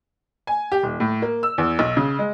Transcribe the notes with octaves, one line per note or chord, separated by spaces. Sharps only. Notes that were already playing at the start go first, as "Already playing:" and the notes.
G#5
G4
D#1
A2
A#3
E6
E2
B1
C#3
G#3